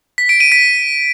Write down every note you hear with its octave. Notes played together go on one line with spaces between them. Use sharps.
B6
D7
D#7
B6